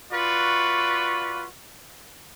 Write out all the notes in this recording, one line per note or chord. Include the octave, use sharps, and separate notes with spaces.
F4 F#4 B4 D5 C#6